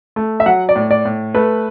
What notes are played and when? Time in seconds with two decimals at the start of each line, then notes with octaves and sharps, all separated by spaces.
0.16 A3
0.40 E5
0.46 F#3 F#5
0.69 D5
0.76 A2
0.91 D5
1.05 A2
1.35 A3 B4